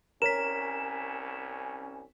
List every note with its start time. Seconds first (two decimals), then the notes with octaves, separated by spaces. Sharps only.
0.22 C2 C#4 A#4 C#5 B6 E7